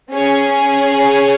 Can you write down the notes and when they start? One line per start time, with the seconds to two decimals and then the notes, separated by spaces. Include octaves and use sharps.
0.11 C#4 G#4 C#5
1.00 C#5